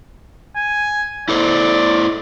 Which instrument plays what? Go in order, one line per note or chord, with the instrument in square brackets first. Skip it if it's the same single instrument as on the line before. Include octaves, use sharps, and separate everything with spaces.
[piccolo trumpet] G#5
[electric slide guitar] E4 A4 C5 [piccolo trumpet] D5